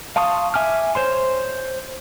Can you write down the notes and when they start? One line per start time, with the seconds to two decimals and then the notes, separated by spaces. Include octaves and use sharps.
0.16 F5 A5 C6 C#6 D#6
0.54 E5 G#5 D6 F6
0.95 C5 C#5 C6